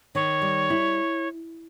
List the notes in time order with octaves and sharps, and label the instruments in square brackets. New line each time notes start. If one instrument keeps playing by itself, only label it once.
[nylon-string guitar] D#3 [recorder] C#5
[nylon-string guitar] G3
E4